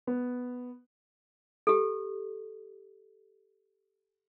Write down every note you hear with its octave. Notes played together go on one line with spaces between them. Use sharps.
B3
G4 A4